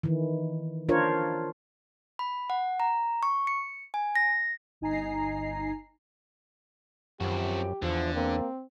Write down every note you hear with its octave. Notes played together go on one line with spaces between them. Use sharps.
D#3 E3
D4 F4 A#4 C5 C#5
B5
F#5
A#5
C#6
C#7
G#5
A#6
G1 D#4 G#5 A#5 C7
F#2 F3 C4 F#4 G4
E2 D3 F3
A#3 C4